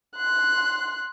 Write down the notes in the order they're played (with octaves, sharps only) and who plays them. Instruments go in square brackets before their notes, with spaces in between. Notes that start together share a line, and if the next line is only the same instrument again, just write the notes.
[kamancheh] C6 F#6